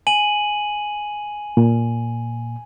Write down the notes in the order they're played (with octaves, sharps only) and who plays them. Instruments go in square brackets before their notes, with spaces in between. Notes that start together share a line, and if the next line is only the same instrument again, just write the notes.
[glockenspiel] G#5 D#7 F#7
[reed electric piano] A#2